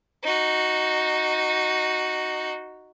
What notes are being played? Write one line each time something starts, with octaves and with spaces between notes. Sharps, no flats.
D#4 F#4